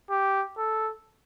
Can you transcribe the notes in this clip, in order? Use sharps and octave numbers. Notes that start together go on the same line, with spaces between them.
G4
A4